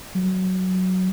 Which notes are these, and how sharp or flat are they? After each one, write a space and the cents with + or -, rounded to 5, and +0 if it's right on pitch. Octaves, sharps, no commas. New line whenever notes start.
F#3 +5